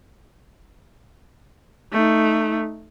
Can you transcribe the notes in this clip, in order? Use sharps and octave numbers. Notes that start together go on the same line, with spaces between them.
A3 D#4